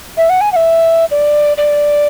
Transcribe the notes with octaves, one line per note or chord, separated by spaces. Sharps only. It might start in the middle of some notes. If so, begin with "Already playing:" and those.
E5
F#5
G#5
F#5
E5
D5
D5